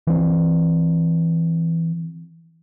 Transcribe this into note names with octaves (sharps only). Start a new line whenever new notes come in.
E3 C4